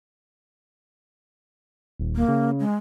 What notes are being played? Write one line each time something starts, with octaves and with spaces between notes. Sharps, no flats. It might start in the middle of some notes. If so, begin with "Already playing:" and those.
D#1
A#3
C#3
G#3